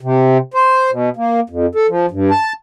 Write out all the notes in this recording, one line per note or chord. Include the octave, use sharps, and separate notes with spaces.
C3
C5
B2
A#3
F2
A4
F3
G2
A5